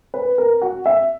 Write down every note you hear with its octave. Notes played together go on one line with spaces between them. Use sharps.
B4
A#4
F#4
E5